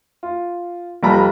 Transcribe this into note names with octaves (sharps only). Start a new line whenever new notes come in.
F4
F1 G3 F4 A4 A#5 B5